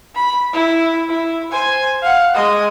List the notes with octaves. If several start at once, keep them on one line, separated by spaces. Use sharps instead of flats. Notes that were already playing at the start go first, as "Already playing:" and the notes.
B5
E4
E4
C5 G#5
F5 F#5
G#3 D#5